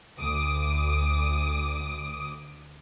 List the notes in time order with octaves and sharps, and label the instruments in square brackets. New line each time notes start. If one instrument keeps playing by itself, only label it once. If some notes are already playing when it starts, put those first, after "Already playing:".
[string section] D2 D6 D#6